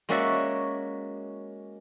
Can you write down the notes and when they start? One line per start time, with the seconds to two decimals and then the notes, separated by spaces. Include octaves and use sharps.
0.09 G#3 A#3 C#4 F#4 D5 E5